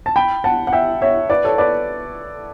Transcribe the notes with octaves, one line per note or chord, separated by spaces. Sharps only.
A5
G5 B5
F#5 A5
F#5
E5 G5
C#5 E5
B4 D5
A4 C#5
B4 D5